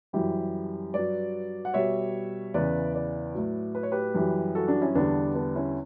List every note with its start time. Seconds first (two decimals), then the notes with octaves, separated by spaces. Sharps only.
0.13 F#2 E3 G3 E4 G4
0.94 G2 F#3 B4 D5
1.65 F#5
1.74 B2 G3 C#5 E5
2.54 E2 C#3 E3 B4 D5
2.95 B4 D5
3.34 A2 F#3
3.75 B4
3.83 C#5
3.92 G4 B4
4.14 F#2 E3 G3
4.55 F#4 A4
4.68 D4 F#4
4.81 C#4 E4
4.95 E2 D3 G3 B3 D4
5.35 B3 D4
5.55 C#4 E4